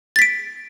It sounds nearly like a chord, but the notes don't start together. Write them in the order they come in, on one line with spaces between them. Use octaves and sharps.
A6 B6 D7